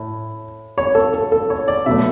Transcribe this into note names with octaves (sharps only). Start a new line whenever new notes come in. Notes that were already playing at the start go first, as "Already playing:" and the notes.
Already playing: A2
C#5
A4
A4
A4
C#5
D5
B2 F#3 A3 E5